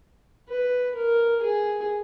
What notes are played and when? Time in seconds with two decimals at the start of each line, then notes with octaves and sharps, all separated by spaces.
0.48 B4
0.95 A#4
1.41 G#4